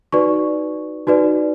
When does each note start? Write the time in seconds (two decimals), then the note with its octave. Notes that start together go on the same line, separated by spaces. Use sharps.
0.12 D#4 F#4 B4 D5 C#6
1.07 D#4 F#4 B4 D5